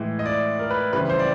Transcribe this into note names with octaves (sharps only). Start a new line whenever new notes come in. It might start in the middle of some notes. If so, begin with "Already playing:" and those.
Already playing: A2 E3 G#3
D#5
D5
A#4
B4
F2 C#3 E3 G3 C4 B4
C5
D5